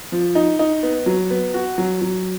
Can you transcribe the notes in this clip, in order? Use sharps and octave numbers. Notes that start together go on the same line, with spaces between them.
F3
D#4
D#4
B3
F#3
B3
F#4
F#3
F#3